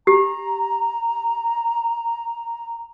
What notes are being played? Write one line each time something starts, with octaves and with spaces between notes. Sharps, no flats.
G4 A#5